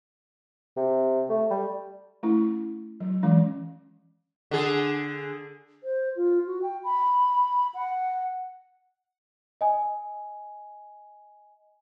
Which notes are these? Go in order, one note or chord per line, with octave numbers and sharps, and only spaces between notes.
C3
A3
G3
A3 C#4 E4
F#3
E3 G#3 C#4
D3 G#4
C5
F4
F#4
G5
B5
F#5
D#5 G#5